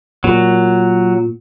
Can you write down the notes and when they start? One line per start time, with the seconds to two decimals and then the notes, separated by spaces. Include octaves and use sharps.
0.24 A#2 F#3